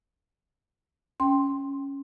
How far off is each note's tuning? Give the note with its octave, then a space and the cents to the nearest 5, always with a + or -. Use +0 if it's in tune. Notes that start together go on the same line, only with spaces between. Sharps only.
C#4 +0 G5 +0 C6 +10